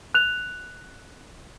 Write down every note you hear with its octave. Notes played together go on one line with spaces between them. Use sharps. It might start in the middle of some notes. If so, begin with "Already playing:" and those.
F#6 F7